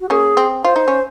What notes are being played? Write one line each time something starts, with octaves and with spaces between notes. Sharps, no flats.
F#4
A#3 C#4 G#4
C4
F4 C5
D#4
C#4